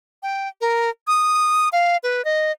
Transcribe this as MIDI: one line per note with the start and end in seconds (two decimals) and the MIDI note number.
0.23 0.48 79
0.61 0.90 70
1.07 1.69 87
1.73 1.97 77
2.03 2.24 71
2.25 2.52 75